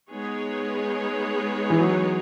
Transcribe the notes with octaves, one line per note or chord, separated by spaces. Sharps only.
G#3 B3 D#4 G#4 C#5
E3
F#3